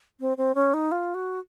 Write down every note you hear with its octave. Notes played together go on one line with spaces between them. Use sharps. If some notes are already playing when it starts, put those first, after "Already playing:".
C4
C4
C#4
D#4
F4
F#4